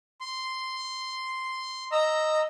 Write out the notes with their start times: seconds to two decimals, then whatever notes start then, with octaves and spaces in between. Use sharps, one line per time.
0.21 C6
1.92 D#5 A#5 E6